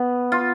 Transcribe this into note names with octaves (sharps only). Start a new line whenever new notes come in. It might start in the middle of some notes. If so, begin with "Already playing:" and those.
Already playing: B3
F4